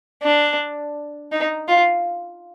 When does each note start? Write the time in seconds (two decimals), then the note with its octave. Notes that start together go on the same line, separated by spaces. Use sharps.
0.23 D4
1.32 D#4
1.68 F4